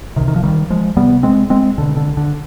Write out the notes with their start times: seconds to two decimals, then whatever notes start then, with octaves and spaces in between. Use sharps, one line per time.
0.16 C3 D#3
0.20 C2
0.28 D#3
0.36 F3
0.43 D#3 G3
0.70 F3 G#3
0.96 C2 C3 G3 B3
1.23 G#3 C4
1.50 G#3 C4
1.77 C2 B2 D3
1.96 D3
2.17 D3